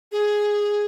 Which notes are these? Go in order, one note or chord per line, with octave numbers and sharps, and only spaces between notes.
G#4